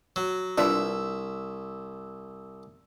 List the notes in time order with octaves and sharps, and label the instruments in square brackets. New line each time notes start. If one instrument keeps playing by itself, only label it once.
[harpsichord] F#3
[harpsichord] C2 E5 [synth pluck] D4 F4 B4